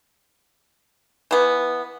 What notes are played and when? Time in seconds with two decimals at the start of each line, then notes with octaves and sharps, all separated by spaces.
1.31 E3 B3